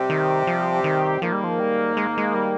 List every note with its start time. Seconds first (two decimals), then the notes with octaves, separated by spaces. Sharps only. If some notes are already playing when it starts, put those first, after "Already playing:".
Already playing: C3 G3 C4 G4
0.10 D#3
0.47 F3
0.84 D#3
1.21 G#2 D#3 F3 A#3
1.33 G3
1.44 F3
1.60 G3
1.97 G#3
2.18 G#3
2.35 G3